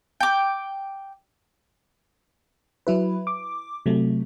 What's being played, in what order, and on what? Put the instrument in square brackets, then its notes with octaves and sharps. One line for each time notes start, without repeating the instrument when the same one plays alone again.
[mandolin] G5 D6
[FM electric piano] F#3 E4 B4
D6
C3 F#3 A3